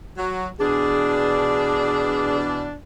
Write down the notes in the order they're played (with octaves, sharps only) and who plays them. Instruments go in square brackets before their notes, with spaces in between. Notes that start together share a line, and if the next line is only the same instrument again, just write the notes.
[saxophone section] F#3
[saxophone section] B2 E3 D4 [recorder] G#4